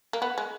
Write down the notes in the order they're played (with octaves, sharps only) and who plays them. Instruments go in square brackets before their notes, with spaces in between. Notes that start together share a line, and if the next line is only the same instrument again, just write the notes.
[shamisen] A#3
B3
G#3